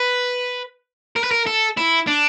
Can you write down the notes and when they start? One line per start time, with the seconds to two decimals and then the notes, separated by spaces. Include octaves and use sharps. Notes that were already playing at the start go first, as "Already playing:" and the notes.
Already playing: B4
1.16 A#4
1.24 B4
1.31 A#4
1.47 A4
1.78 E4
2.08 D4